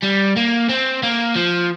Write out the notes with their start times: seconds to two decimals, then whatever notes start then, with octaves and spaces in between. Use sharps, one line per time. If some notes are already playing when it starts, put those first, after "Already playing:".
0.03 G3
0.36 A#3
0.69 C4
1.03 A#3
1.36 F3